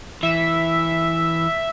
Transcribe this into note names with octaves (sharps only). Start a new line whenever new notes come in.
E3 E5